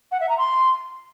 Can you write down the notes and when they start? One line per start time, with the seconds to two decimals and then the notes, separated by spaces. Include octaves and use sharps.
0.12 F#5
0.20 E5
0.29 A#5
0.38 C6